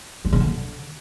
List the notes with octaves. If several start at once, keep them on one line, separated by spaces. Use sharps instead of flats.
G#3
C#3
D3